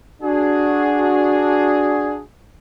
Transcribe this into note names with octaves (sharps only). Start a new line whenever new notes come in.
D4 F#4 G#4